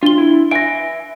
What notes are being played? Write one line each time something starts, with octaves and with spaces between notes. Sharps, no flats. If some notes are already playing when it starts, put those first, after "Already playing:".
D4 F4 G7
E4
E5 G#5 A#6 D7